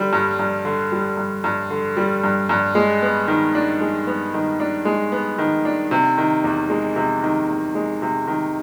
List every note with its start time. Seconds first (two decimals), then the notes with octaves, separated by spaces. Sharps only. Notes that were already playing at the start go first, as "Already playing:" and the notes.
Already playing: D3 G3
0.13 G2
0.39 G2
0.65 D3
0.92 G3
1.17 G2
1.44 G2
1.70 D3
1.97 G3
2.24 G2
2.49 G2
2.75 G#3
3.02 B3
3.28 D#3
3.55 D4
3.81 G#3
4.07 B3
4.34 D#3
4.60 D4
4.85 G#3
5.12 B3
5.38 D#3
5.65 D4
5.91 C3
6.18 D#3
6.44 E2
6.70 G#3
6.96 C3
7.23 D#3
7.49 E2
7.75 G#3
8.02 C3
8.27 D#3